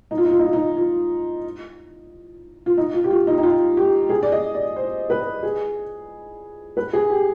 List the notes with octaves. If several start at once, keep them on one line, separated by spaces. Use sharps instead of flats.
D#4
F4
D#4
F4
D#4
F4
D#4
F4
F4
D#4
F4
G4
F4
D#4
D#4
F4
G4
G#4
D5
D#5
D5
C5
B4
G#4
B4
G#4
G4